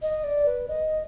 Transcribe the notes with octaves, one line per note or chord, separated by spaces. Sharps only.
D#5
D5
B4
D#5